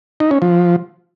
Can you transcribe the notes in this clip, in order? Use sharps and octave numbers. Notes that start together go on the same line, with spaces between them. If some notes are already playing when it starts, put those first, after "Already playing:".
D#4
C#4
F3